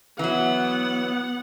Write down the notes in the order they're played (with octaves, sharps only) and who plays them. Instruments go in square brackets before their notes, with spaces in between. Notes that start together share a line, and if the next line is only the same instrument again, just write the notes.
[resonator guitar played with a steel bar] E3 F#3 [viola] B3 F#5